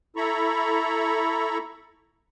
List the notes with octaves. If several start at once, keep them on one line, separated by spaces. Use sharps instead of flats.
E4 A4 A#5 B5 C#6